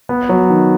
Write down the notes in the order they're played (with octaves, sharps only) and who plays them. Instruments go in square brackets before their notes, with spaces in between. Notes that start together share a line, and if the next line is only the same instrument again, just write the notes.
[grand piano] B3
F#3
D#3